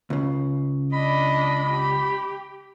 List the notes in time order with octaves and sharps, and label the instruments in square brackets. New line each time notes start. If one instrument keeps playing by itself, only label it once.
[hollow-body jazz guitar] C#2 C#3
[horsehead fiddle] D4 D#5 [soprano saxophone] B5
[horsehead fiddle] G4